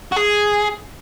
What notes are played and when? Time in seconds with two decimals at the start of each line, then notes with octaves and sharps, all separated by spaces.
0.12 F#4
0.16 G#4